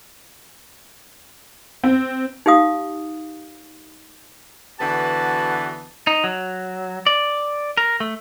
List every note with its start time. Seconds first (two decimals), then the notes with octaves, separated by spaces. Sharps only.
1.84 C4
2.46 D#4 G4 F5 D#6
4.79 D3 E3 B3 F#4 F#5 A5
6.07 D#4
6.24 F#3
7.07 D5
7.77 A#4
8.00 A3